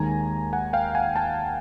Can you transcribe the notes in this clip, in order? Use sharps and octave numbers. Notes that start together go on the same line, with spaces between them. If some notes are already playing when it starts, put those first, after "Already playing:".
Already playing: D#2 D#3 G#3 G#5 A#5
F#5 G#5
F5 G5
F#5 G#5
G5 A5